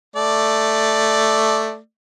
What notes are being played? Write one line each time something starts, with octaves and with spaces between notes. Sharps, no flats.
A3 D5